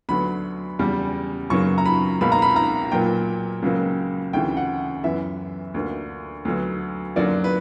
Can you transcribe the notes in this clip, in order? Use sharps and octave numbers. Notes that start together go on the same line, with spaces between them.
D2 D3 F#3 B3 B5
E2 C#3 G3
F#2 C#3 F#3 A#3 C#6
A#5
B5
C#2 B2 A#3 B5
A#5
B5
A#5
A#2 F#3 A#3 G5
C#2 C#3 F#3 A#3
D2 C#3 E3 G5
F#5
F#2 E3 B3 E5
D2 D3 A#3
D2 D3 F#3 B3
F#2 D3 F#3 A#3 D5
B4